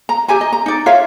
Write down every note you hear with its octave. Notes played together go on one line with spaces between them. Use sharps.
A#5
G4 E5 G#5 A#5
D#5
A#5
D#4 D5
F4 C#5 E5 F5